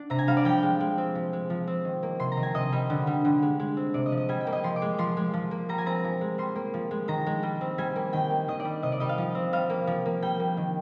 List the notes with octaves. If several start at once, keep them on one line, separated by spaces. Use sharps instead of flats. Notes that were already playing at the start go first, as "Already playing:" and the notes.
Already playing: D4
C3 A#5
G#5
G3 F5
D5
F3 G5
G#3
G#3
C4
F3
G#3
F3
C4
D#3
A#3
C3 C6
A#5
D#3
G#5
C3 D#5
G3
D3
G3
D3
G#3
G#3
C4
C3 D5
D#5
F3
D#5
G3 G#5
G5
A#3
D#5
F3 C6
D6
G#3
F3 C6
G#3
F3
A#3
G3 A#5
G#5
C4 A#5
F3
G#3
G3 C6
A#3
F3
G#3
D#3 A#5
G#3
G3
C4
G3 G#5
A#3
D#3 G5
A#3
D#3 D#5
D5
G3
C3 D#5
D5
G3 D#5
F5
F3
C4
G3 F5
A#3
F3
A#3
G3 G5
A#3
D#3